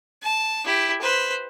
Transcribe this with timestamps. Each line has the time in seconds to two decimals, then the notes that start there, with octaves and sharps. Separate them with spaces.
0.23 A5
0.65 E4 G4
1.01 B4 C5